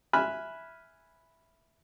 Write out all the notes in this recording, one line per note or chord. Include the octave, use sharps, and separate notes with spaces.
E5 G#5 B5 F6 F#6